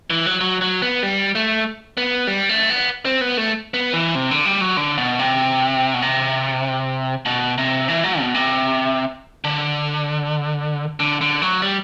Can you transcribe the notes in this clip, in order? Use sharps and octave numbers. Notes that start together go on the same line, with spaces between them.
E3
F#3
F#3
F#3
B3
G3
A3
B3
G3
A3
B3
C4
B3
A3
B3
E3
C3
D3
G3
F#3
D3
B2
C3
B2
C3
B2
C3
E3
F#3
B2
C3
D3
D3
D3
F#3
G3